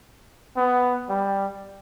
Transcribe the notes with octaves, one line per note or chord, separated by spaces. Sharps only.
B3
G3